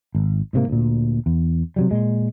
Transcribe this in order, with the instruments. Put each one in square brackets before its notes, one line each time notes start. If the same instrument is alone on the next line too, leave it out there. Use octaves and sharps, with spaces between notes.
[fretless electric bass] G#1
G#2 C3 A#3
D2 A#2
E2
C3 F#3 G3
A#2 G#3